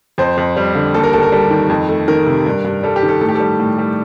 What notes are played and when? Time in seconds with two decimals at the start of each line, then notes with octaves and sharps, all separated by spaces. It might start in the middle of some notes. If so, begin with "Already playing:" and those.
0.18 F2 C5
0.37 F2
0.57 G3
0.75 D3
0.94 D#2 A4
1.03 A#4
1.13 D#2 A4
1.22 A#4
1.32 G3 A4
1.51 D#3
1.69 F2
1.89 A3
2.08 D#3 A#4
2.26 C3
2.46 G2
2.65 G2
2.83 G3 A4
2.96 G4
3.03 D#3
3.08 A4
3.21 A2 A4
3.29 G4
3.35 G3 A4
3.60 A2
3.78 G3